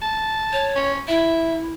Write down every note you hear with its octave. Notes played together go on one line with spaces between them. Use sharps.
A5
C#5
C#4
E4 E5